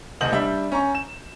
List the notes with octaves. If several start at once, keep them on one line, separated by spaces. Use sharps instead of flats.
F#1 C2 D#5 G6 F#7
G3 D4 E5
C#4 A#5 C#6
E7